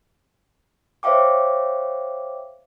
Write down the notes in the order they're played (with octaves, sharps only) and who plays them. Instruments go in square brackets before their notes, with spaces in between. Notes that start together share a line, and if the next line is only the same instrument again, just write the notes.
[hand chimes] C5 C#5 E5 F5 G5 D6